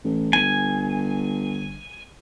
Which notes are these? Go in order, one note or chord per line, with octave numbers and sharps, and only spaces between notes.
A1
G1 G#5